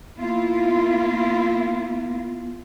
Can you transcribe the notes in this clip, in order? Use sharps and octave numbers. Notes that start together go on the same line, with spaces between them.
A#3 B3 E4 F4